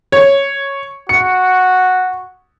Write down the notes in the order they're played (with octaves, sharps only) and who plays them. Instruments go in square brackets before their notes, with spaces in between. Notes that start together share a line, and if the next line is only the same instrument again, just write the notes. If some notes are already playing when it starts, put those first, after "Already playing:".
[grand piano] C#5
[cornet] F#4 [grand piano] C#7